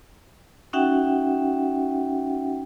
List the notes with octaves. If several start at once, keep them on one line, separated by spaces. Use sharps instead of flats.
C#4 D#4 F#4 E5 F#5 G5